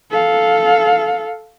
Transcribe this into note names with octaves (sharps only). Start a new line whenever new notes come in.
A4 F5